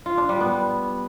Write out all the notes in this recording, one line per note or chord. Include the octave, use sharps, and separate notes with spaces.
F4
D4
G3
B3